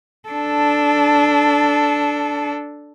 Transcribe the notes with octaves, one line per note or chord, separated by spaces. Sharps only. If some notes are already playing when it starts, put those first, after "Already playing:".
D4 A4